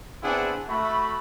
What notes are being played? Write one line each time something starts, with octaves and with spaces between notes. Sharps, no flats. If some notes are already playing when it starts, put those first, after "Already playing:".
B3 C4 D4 E4 G#4 F#5
A3 F#4 E5 B5